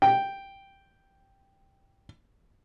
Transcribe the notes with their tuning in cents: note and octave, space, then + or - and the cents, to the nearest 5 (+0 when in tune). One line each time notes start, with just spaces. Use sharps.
G5 +0